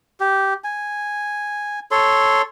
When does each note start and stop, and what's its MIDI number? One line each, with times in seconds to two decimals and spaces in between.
0.20 0.54 67
0.64 1.80 80
1.91 2.42 69
1.91 2.42 73
1.91 2.42 84